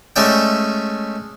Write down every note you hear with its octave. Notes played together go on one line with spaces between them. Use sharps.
G#3 A3 C#4 D5 E5 G5